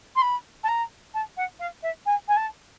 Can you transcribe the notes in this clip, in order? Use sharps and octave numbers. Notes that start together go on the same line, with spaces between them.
C6
B5
A5
A#5
A5
F#5
F5
E5
G#5
G#5
A5